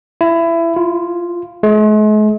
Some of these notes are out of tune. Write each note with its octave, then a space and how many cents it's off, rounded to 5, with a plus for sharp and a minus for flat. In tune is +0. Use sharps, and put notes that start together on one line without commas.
E4 +20
F4 -5
G#3 +45